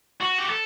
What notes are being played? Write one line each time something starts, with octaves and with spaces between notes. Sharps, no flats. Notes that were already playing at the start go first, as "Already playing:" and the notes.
F#4
G4
A4